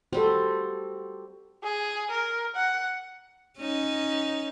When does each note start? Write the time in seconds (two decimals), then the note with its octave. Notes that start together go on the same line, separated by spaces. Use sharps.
0.13 G3 C4 F#4 A4
1.63 G#4
2.10 A#4
2.55 F#5
3.58 C#4 D#4